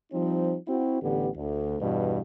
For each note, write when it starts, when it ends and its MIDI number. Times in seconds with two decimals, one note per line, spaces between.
0.12 0.56 53
0.12 0.56 55
0.12 0.56 60
0.12 0.56 63
0.67 0.98 60
0.67 0.98 64
0.67 0.98 66
1.01 1.28 33
1.01 1.28 50
1.01 1.28 59
1.01 1.28 67
1.36 1.76 38
1.80 2.20 40
1.80 2.20 43
1.80 2.20 47